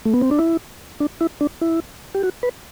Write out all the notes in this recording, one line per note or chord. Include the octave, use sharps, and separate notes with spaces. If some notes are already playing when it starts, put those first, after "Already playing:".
A3
B3
C4
D4
E4
D4
E4
D4
E4
G4
F#4
B4